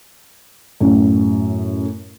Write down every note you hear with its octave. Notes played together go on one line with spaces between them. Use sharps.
F#2 A2